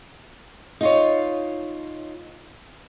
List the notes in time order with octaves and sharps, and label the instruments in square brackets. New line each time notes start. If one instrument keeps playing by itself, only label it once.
[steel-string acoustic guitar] D#4 F4 C#5